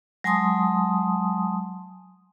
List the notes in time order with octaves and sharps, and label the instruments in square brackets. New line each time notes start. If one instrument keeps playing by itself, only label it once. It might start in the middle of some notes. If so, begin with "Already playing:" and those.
[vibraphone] F#3 G#3 G#5 A5 C6 D#6